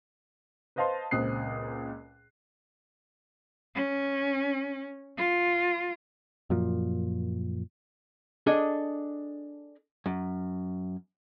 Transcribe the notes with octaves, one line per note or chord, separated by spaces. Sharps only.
B4 C5 D#5 F5 A5 C6
C#2 A#2 C4 D#6 F#6 C7
C#4
F4
F#2 A#2 F3
D4 G#4 A4 D#5
F#2